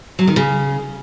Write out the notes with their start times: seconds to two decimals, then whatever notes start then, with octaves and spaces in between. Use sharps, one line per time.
0.19 F#3
0.27 D#3
0.36 C#3